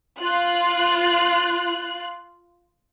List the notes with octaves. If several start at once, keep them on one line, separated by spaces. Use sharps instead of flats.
F4 F#6